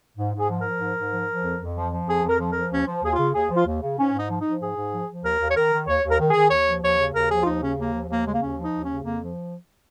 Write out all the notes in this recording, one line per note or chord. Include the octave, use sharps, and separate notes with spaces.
G#2
G#2 G#4
F3
A#4
F3
G#2
G#2
F3
F3
F2
F2
F3
F3
F2 G#4
F2
A#4
F3
A#4
F3
D#2 C#4
F3
D#2 G#4
F4
C#3
D#2 G#4
F3
F4
D#2
C#3
G#2 C#4
G#2
D#4
F3
D#4
F3
G#2 G#4
G#2
F3
F3
D#2 A#4
D#2
C#5
D#3 A#4
D#3
D#2 C#5
D#2
A#4
D#3
D#3 G#4
D#2 C#5
F3
D#2 C#5
C#3
D#2 A#4
F3 G#4
F4
D#2 D#4
C#3 C#4
D#2 A#3
F3
D#2 A#3
C#3 G#3
A#3
D#2 C#4
F3
D#4
D#2
C#4
C#3
F2 A#3
F3